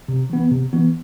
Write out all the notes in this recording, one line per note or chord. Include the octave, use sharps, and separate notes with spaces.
C3
E3 B3
C3
E3 B3